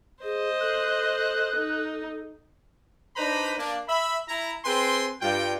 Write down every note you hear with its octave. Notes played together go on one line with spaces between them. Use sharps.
G#4 C5 D#5
A4 F#6
D#4
D4 D#4 B4 C5 A#5 B5
A#3 D4
E5 B5
E4 A#5
C4 G#4 B4 G5 C6
G2 F4 G5